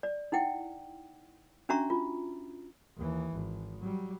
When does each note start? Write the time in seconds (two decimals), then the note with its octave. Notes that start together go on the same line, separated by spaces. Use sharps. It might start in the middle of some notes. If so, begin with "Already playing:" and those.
0.03 D5
0.32 D#4 E4 F#5 G5
1.69 C#4 D4 F#4 E5 A#5 C#6
1.90 F4
2.97 D#2 E3
3.33 G#1
3.80 F#3 G3